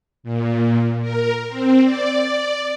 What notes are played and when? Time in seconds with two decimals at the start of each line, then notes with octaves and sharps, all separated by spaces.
0.23 A#2
1.01 A#4
1.49 C4
1.84 D5